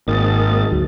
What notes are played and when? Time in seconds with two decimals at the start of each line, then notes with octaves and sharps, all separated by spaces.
0.08 G#1 A#3 D#5 A6
0.72 D2 F#3